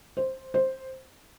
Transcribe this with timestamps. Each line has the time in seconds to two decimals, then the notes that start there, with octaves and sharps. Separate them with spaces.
0.17 C5
0.54 C5